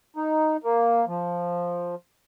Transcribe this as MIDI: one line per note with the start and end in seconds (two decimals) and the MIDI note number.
0.16 0.57 63
0.64 1.05 58
1.08 1.95 53